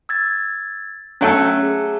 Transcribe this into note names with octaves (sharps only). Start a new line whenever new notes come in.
E6 G#6 A6
F#3 A3 C#4 A4
G#4